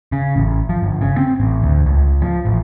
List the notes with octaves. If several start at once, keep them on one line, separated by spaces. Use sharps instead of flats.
C#3
A1
F3
G1
C#3
C4
A1
D2
C#2
F3
A1